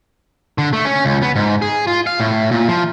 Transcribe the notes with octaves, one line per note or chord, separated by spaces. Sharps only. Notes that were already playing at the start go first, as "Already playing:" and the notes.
D3
A3
C#4
C#2
B3
G#2
G#4
F4
F5
A2
A#2
F3